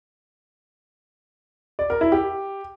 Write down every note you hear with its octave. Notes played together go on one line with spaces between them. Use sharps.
D5
A#4
E4
G4